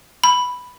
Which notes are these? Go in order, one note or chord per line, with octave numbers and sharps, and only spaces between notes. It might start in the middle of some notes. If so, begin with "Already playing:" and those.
B5